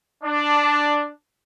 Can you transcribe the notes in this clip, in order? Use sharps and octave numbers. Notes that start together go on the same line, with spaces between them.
D4